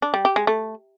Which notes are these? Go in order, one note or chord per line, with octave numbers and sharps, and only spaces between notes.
D4
G3
G4
G#3
A3